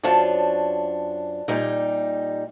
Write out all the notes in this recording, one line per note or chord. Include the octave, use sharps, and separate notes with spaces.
F#2 D4 F4 C5 C#5 A5
A#2 G3 D#4